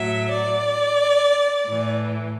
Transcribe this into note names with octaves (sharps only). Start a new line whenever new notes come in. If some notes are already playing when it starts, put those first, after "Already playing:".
Already playing: A2 F#3 E5
D5
A2 E3